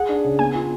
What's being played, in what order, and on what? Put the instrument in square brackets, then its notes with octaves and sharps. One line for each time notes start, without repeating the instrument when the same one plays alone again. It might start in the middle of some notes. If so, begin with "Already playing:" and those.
Already playing: [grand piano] G#4 [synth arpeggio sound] F#5
[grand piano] D4
C#3
[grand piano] B3 [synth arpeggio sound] G#5
[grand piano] F4